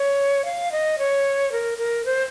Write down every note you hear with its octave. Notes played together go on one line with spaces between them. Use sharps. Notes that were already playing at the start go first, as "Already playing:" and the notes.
Already playing: C#5
F5
D#5
C#5
A#4
A#4
C5